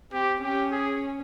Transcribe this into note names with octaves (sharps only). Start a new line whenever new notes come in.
C4 G4
C#4 G4
G#4